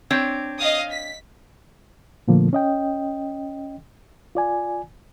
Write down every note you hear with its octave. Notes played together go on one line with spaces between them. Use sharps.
C4 D4 C#5
D#5 F5 D#6
B6
A#2 D3 F3 A3 A#3
C#4 D#5 G5
F4 D5 G#5